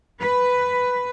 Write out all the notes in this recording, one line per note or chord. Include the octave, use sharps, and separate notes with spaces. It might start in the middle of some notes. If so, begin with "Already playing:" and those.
B4